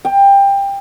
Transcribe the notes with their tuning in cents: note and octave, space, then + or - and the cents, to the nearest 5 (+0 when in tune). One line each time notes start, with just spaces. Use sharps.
G5 +20